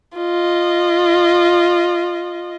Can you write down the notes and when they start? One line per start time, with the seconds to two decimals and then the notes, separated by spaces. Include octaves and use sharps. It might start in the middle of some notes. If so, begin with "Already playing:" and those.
0.18 F4 D#5